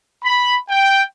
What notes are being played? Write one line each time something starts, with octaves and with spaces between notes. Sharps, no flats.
B5
G5